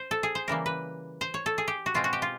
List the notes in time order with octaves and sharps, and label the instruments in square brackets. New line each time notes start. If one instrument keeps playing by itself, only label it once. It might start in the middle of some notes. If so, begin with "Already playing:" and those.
Already playing: [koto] C5
A4
G#4
C5
C#3 E3 G3 A#3 A#4
B4
C5
C#5
A4
G#4
G4
F#4
B2 G#3 C4 F4
F#4
G4
F4